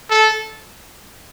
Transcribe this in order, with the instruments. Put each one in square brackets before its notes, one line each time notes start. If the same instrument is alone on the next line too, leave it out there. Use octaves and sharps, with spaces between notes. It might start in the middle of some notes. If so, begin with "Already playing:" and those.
[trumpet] A4